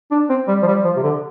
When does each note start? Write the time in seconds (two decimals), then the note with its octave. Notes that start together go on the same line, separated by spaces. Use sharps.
0.11 D4
0.29 C4
0.48 G3
0.62 F3
0.67 G3
0.84 F3
0.97 C3
1.03 D3